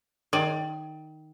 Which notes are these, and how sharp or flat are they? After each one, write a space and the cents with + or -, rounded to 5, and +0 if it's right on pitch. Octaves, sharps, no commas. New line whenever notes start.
D#3 +0 G#4 +35 D5 +15